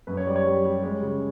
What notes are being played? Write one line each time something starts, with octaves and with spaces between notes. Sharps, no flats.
F#2 B4
C#5
G3 D5
C#5
G3
G3
G#3 C#5
C#3